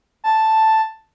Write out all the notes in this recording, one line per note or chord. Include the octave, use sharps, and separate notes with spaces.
A5